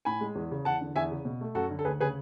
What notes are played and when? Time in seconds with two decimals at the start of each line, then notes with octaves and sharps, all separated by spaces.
0.05 A2 G#5 B5
0.21 G#3
0.35 E2
0.51 C#3
0.65 E2 F#5 A5
0.81 D3
0.96 E2 E5 G#5
1.11 C#3
1.25 B2
1.41 A3
1.55 F#2 F#4 A4
1.71 D3
1.79 A4
1.85 D2 G#4 B4
2.00 C#3 G#4 B4